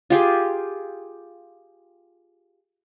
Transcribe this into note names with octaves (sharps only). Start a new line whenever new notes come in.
F4 G4 G#4